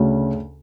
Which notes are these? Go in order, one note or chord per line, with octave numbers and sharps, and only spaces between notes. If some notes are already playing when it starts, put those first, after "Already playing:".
Already playing: D2 C#3